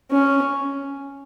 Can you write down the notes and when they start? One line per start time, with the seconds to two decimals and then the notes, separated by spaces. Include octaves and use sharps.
0.11 C#4